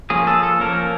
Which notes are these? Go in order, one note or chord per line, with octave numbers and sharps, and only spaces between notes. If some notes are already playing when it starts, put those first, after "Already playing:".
F3 A#3 C#4 G#4
A4
A4
F3 A#3 C#4 A#4